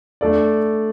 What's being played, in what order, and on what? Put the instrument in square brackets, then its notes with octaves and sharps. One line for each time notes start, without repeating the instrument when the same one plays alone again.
[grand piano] A3 D4 A4 D5